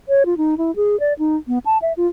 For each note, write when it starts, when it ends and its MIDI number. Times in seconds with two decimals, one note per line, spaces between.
0.09 0.23 73
0.26 0.37 65
0.37 0.55 63
0.58 0.74 64
0.76 0.99 68
1.00 1.13 74
1.19 1.36 63
1.48 1.59 59
1.66 1.78 81
1.82 1.93 76
1.97 2.07 65